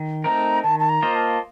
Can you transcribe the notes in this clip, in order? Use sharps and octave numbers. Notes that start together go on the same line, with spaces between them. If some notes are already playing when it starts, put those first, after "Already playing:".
Already playing: D#3
A3 C4 D#4 A#4 A#5
D#3 A5
A5
A#5
A#3 F4 C5 D#5
A5